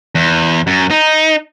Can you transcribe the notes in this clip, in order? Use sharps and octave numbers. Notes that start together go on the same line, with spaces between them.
E2
F#2
D#4